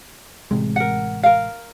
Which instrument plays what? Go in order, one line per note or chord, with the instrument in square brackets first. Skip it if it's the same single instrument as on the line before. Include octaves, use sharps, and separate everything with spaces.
[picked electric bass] A1 C3 G#3
[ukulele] A#4 F#5
A#4 F5